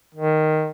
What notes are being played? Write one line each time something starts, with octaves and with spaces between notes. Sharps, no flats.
D#3